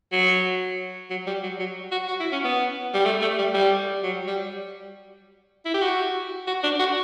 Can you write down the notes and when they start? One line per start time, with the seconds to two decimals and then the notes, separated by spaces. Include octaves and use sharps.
0.12 F#3
1.10 F#3
1.27 G3
1.43 F#3
1.59 F#3
1.92 F#4
2.08 F#4
2.20 E4
2.32 C#4
2.44 B3
2.94 G3
3.06 A3
3.21 A3
3.38 G3
3.54 G3
4.03 F#3
4.27 G3
5.66 E4
5.74 G4
5.82 F#4
6.47 F#4
6.63 D4
6.79 F#4